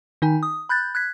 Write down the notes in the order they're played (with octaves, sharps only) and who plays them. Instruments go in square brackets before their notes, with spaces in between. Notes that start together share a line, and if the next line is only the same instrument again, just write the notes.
[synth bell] D#3 D#4 G#5
D#6
B5 F#6 G6 A6
F#6 G#6 B6